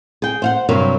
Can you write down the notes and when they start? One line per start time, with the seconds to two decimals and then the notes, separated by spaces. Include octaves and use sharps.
0.22 G#4 G5
0.42 C5 F5 F#5
0.69 G2 C3 F#3 A#4